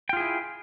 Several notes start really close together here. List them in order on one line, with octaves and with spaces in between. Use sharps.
G5 F4 G#4 E4